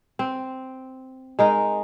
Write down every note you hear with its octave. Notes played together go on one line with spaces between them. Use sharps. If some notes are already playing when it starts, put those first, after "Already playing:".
C4
G#3 D#4 A#4